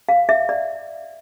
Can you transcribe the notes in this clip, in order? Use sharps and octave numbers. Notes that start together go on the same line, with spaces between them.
F5
E5
D5